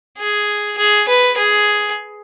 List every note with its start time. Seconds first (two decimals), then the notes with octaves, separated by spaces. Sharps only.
0.18 G#4
0.77 G#4
1.08 B4
1.37 G#4